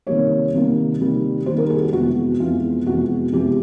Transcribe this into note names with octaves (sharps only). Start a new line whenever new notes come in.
C3 D#3 G3 A#3 C#5
C3 D#3 G3 A#3
C3 D#3 G3 A#3
C3 D#3 G3 A#3 C5
A#4
G#4
F#4
F2 C3 E3 G#3 B3 F#4
F2 C3 E3 G#3 B3 F4
F2 C3 E3 G#3 B3 F#4
F2 C3 E3 G#3 B3 G4